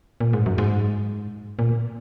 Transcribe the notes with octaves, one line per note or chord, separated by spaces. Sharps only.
A#2
G#2
F#2
G#2
A#2